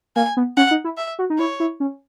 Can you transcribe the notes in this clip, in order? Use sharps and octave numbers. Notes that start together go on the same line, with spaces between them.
A#3 G#5
B3
C#4 F#5
D#4
E4
E5
F#4
D#4
E4 C#5
E4
C#4